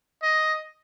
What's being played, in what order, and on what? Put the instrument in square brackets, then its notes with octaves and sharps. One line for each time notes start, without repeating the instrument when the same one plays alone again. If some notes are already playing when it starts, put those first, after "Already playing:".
[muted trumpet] D#5